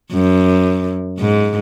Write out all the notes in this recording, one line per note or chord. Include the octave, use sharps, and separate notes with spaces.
F#2
G#2